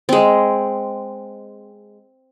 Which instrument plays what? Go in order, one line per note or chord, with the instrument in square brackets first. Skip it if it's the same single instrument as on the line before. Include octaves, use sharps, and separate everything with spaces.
[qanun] G#3 C4